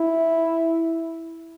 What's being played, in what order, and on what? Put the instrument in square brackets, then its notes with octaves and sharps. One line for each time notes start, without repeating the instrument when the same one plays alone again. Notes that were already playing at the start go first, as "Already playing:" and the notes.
Already playing: [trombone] E4